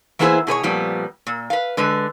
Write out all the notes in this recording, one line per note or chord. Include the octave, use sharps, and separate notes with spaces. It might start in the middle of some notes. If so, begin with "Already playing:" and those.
E3 A#3 B3 E4 G#4 C5
B2 G#4 B4 C#5
F2 A#2 G3 B3
A#2
B4 F5
D3 G#3 B4